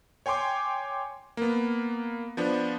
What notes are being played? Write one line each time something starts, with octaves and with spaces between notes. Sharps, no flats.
C#5 G5 G#5 C6 D6
A#3 B3
F3 B3 D4